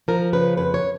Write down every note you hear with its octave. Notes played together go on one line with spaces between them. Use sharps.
F3 A#4
C#3 B4
F2 B4
C#5